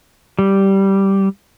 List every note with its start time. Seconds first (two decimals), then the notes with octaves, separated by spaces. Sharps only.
0.39 G3